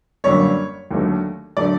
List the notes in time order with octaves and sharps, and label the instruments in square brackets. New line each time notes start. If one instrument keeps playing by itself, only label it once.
[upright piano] G1 F#2 D3 G3 A#3 C#5
D#2 D3 F#3 A3
D3 F#3 A3 D5